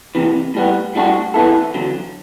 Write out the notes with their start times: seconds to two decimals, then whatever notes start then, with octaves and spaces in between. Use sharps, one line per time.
0.15 E2 C3 E3
0.54 A2 G3 B3
0.95 A2 G3 D4 F#4
1.34 E3 B3 E4 A4
1.74 E2 D3 F#3